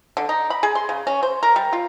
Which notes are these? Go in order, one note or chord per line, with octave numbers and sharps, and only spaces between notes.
D3
D#4
B5
G#4
C6
C#3
C#4
C5
A#4
G3
F4